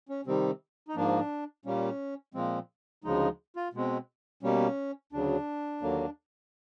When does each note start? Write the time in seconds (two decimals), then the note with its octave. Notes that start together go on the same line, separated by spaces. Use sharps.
0.09 C#4
0.26 C3 D#3 G3 C4
0.88 D#4
0.96 G#2 F3 A#3 D4
1.65 A#2 G3 A#3 C#4
2.34 A#2 F3 G#3 C4
3.04 D2 C#3 F3 G#3 D#4
3.56 F4
3.73 B2 G#3 C4
4.43 B2 G3 A#3 C#4
5.12 D2 C#3 F#3 D4
5.81 D#2 D3 F#3 A#3